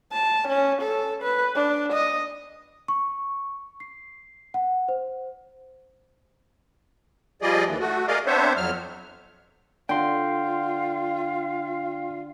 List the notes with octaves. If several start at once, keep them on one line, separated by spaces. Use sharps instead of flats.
A5
C#4
A4
B4
D4
D#5
C#6
C7
F#5
C5
F3 G3 G#4 D5 D#5
D#2 E3
A3 F#4
G#4 A#4 D5 D#5 F5
B3 C4 D4 C5 C#5 E5
F2 F#3 F6
D3 F4 F5 G5 C6